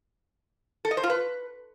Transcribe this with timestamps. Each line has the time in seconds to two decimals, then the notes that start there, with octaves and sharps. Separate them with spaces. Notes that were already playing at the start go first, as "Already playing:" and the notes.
0.85 A4
0.91 D#5
0.97 C5
1.03 F4
1.10 B4